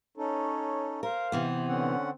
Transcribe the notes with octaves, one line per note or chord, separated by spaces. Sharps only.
C#4 D#4 A4 C#5
A#4 C5 F5
C3 E3 B3
D3 C4 C#4 F#5